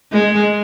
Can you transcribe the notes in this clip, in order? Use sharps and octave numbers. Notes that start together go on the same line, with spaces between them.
G#3